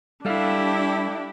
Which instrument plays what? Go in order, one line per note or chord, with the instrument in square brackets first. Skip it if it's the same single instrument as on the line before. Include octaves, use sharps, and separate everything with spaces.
[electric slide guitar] G3 A4 F5 [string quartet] D4 E4 G4